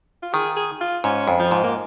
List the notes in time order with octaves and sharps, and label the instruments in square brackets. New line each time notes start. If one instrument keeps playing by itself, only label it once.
[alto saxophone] F4
[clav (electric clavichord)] D#3 [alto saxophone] G#4
[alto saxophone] G#4
F4
[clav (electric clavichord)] G#2 [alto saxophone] C#4
[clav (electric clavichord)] F2
[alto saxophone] F3
[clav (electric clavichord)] G#2
[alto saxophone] A#3